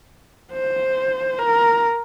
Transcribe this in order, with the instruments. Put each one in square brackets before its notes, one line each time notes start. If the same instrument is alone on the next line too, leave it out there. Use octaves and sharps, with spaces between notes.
[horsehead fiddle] C5
A#4